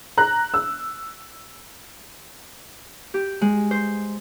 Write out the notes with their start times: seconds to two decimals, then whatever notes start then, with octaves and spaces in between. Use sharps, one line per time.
0.18 A#5 F#6
0.54 E6
3.14 G4
3.41 G#3
3.71 C5